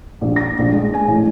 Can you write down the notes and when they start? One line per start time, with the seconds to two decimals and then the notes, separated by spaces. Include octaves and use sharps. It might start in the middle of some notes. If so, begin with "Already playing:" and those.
0.21 A#1
0.36 A#6
0.59 A#1
0.73 G#3
0.94 G#5
1.08 A1